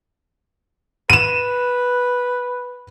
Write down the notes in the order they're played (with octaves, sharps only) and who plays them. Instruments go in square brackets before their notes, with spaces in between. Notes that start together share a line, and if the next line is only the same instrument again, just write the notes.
[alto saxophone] B4 [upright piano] D#7 E7